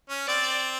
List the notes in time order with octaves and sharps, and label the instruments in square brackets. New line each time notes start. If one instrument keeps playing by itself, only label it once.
[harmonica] C#4
[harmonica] C4 [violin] D5